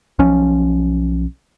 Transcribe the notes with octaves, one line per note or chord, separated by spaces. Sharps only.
B1 F3 C#4